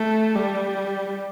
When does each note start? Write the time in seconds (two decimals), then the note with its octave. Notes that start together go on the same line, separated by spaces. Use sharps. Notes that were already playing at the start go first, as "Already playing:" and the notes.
Already playing: A3
0.35 G3